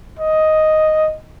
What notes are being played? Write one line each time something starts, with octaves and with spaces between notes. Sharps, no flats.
D#5